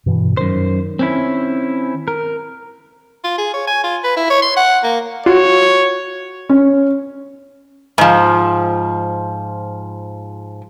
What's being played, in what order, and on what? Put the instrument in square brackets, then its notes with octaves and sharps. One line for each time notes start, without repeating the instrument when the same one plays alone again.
[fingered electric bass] G2 B2 E3
[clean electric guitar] F#2 C5 [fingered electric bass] D#3
[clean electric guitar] C4 C#4 E4
A#4
[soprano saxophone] F4
G#4
C#5
G#5
F4
B4
E4
C#5
C6
F#5
A#3
[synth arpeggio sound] F4 [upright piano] F#4 [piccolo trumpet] C#5
[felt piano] C#4
[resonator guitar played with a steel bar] G#2 F3